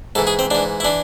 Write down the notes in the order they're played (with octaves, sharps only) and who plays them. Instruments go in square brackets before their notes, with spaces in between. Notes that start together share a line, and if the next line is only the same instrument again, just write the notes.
[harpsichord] G#2 E3 A4
G#4
C4
G#2 E3 D4
E4
E3 D4